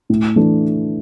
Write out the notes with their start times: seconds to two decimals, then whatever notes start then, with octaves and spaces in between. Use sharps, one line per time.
0.10 A2
0.36 E3 A3 D4